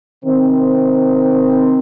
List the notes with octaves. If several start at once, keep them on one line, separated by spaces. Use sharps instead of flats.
C3 D#3 C4